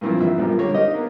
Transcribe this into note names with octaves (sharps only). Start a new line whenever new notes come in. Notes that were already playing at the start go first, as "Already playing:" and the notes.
G2 A#2 E3 F3 C4
A#1 E5
F#2 A#2 G3 A#3 B3
D3 G3 A#3 A#4 C#5
D#4 G4 A#4 D#5
A#3 B3